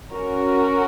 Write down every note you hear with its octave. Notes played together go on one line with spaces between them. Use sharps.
C#4 F#4 A#4